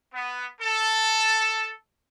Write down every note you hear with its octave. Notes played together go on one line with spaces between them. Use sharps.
B3
A4